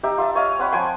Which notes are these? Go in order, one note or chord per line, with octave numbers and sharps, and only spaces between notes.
D#4 G4 E5
F4 E5 A5
C#5 D#5 F5
C4 C#5 F#5 B5
F3 G5 G#5 C6